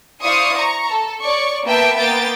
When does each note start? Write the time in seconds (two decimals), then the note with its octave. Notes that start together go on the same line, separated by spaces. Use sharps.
0.23 E4 C5 D5 F5 C#6 D#6
0.57 A#5 C#6
0.89 A4
1.21 C#5 D5 C#6
1.65 A#3 B3 B4 E5 G5 A5
1.97 A#3 B3 G5 A6